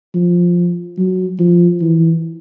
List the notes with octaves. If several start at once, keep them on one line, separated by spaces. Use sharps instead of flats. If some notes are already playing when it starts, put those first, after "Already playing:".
F3
F#3
F3
E3